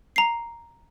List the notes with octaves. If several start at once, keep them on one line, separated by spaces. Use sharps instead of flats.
A#5 C7